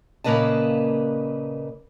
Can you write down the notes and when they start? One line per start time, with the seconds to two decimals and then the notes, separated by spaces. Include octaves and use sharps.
0.24 A#2 C#3 A#3 B4 D#5 A5